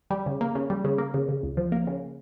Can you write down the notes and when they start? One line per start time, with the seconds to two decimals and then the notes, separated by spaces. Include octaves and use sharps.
0.10 G3
0.26 C#3
0.41 A#3
0.55 C#3
0.70 G3
0.84 C#3
0.98 A#3
1.14 C#3
1.29 C#3
1.43 C#2
1.57 F3
1.72 A#3
1.87 C#3